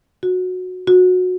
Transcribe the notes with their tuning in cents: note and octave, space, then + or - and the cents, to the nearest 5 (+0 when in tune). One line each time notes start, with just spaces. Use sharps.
F#4 -15
F#4 -20